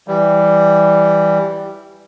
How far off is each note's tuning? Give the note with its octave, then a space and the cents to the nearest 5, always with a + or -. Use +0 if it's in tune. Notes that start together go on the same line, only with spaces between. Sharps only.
E3 +0 G3 +0